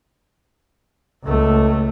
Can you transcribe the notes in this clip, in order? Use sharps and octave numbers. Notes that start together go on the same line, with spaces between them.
C#2 A3